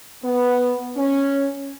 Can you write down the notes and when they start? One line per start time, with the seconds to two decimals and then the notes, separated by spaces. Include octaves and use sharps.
0.24 B3
0.97 C#4